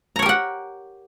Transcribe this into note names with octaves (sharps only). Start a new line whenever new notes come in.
G4 A#4 C#5 F#5 A#5